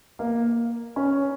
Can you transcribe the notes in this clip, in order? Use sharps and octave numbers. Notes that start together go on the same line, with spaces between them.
A#3
C#4